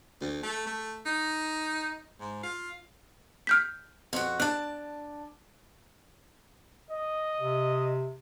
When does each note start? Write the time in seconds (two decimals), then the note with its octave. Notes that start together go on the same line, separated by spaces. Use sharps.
0.21 D2
0.43 A3
0.67 A3
1.06 D#4
2.20 G#2
2.43 F4
3.47 F6 G6 B6
4.13 F2 F#4
4.40 D4 A5 F#6
6.90 D#5
7.40 C3